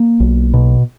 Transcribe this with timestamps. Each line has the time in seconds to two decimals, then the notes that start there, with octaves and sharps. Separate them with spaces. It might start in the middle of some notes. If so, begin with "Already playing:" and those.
Already playing: A#3
0.20 B1
0.54 B2